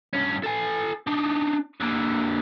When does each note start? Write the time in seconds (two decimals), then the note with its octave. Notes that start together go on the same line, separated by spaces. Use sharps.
0.13 G2 C#4
0.44 A4 G#5
1.07 D4 D#4
1.81 D3 A#3